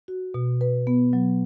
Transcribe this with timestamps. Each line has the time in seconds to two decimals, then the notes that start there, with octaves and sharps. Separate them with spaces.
0.08 F#4
0.34 B2
0.61 B4
0.87 B3
1.13 F#3